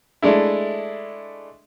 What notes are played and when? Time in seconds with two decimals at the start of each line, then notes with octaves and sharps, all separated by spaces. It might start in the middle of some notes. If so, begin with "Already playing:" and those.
0.22 G#3 A3 D4 E4